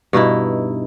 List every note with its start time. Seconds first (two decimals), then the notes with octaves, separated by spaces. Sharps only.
0.13 G2 B2 D#4 E4